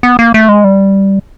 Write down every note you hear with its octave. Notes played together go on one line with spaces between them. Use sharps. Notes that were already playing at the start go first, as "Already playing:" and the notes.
B3
A#3
A3
G#3
G3